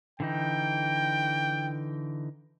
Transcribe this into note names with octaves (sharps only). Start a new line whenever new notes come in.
D3 E3 D#4 G5